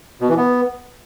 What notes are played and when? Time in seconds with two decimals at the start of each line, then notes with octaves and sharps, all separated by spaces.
0.21 B2
0.29 E3
0.37 B3